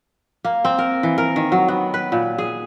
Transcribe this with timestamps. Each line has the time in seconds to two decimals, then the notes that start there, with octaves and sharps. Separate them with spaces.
0.45 A#3
0.65 C4
0.78 A#4
1.03 E3
1.18 A#4
1.36 D#3
1.52 F#3
1.68 B3
1.94 B4
2.12 A#2
2.38 G#4